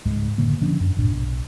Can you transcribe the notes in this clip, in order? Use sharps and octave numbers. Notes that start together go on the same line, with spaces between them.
C#2 G#2 G#3
F#1 A2 D3 A#3
D3 F3 C#4 D4
F#2
F#1 B1 A2 D4
B1